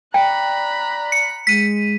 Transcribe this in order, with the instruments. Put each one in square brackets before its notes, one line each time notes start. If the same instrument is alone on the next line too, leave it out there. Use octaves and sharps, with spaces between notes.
[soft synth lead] D5 [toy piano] G5 [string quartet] A#5 B5 F#6
[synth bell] C#7
[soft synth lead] G#3 [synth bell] B6 D#7